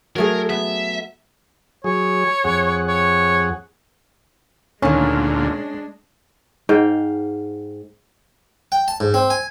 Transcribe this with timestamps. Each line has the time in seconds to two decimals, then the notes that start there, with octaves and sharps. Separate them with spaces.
0.16 F#3 A3 G#4 A#4
0.50 B3 E5
1.84 F#3 G#4 C#5
2.44 F2 G#4 F#5
2.87 C#5
4.82 D2 A#2 D#3 G#3 A#3 C#4 D4
6.69 G#2 F5 G5
8.72 G5
8.88 A5
9.00 G#2
9.14 C4
9.30 G#5